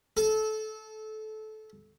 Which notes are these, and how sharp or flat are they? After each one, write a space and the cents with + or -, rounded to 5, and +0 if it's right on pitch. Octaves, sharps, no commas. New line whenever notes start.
A4 -20